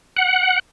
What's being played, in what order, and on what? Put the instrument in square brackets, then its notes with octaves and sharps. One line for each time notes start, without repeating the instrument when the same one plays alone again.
[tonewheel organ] F#5